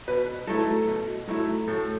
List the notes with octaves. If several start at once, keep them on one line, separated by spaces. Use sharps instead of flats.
B2 B4
F#3 A3 E4 A4
B2
F#3 A3 E4
A2 A4